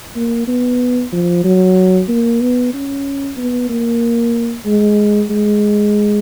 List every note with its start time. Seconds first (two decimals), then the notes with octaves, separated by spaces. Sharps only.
0.16 A#3
0.48 B3
1.12 F3
1.44 F#3
2.09 A#3
2.41 B3
2.74 C#4
3.37 B3
3.69 A#3
4.66 G#3
5.30 G#3